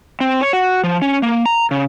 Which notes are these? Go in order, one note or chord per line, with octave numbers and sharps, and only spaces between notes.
C4
C#5
F#4
F3
C#4
A#3
A#5
C#3